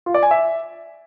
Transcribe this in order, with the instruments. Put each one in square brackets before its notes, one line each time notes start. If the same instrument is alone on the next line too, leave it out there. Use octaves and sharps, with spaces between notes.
[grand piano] F4
D5
G#5
E5